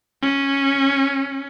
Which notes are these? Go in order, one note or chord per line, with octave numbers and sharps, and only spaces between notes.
C#4